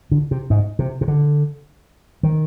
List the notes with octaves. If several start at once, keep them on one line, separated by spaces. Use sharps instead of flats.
D3
C3
G#2
C3
C3
D3
D#3